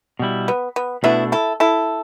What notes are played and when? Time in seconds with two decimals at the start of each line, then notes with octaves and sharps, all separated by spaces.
0.19 B2 G3 E4
0.48 B3
0.76 B3
1.04 B2 A3 B3 D4 E4
1.32 E4 A4
1.60 E4 A4